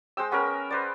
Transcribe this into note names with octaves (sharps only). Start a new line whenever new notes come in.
G#3 C5 G5 E6
B3 C#4 G#4 A#4
B4 C5 D5